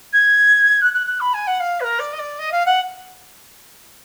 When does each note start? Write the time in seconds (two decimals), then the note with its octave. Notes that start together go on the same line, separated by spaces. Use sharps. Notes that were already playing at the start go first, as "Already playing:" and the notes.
0.12 G#6
0.81 F#6
0.93 F#6
1.07 F#6
1.20 B5
1.33 G#5
1.47 F#5
1.60 F5
1.80 B4
1.83 A#4
1.99 D5
2.12 D#5
2.18 D5
2.38 D#5
2.52 F5
2.65 F#5